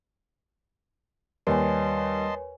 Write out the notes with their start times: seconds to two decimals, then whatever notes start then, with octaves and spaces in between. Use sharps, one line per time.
1.47 D#2 G3 B4 C#5 D#5 G#5 A5 C6